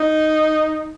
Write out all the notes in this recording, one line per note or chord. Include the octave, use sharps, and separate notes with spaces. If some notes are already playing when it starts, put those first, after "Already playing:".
Already playing: D#4